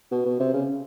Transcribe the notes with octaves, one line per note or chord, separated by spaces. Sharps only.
B2
B2
C3
C#3